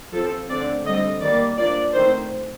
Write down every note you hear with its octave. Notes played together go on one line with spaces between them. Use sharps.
F3 C4 A4
D3 A3 C4 D5
D3 G3 C4 D#5
D#3 G3 A#3 D5
F3 A#3 D4 D5
D#3 A3 C4 C5